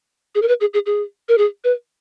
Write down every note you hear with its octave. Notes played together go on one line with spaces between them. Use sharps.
G#4
A#4
B4
G#4
G#4
G#4
A#4
G#4
B4